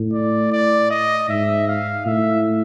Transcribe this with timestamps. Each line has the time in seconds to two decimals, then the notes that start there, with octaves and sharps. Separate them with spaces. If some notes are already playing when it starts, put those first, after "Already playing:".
Already playing: A2
0.13 D5
0.52 D5
0.91 D#5
1.29 G#2 E5
1.68 F5
2.06 A2 E5